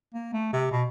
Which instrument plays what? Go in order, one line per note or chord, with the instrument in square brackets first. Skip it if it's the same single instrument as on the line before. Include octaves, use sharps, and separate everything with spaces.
[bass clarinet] A#3
A3
C3
B2